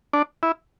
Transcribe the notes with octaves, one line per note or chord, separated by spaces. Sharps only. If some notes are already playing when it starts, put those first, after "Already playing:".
D4
E4